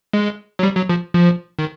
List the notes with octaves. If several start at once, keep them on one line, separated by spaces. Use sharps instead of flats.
G#3
F#3
G3
F#3
F3
F3
D#3